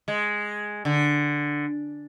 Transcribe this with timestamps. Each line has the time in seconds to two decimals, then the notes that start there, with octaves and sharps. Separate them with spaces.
0.08 G#3
0.85 D3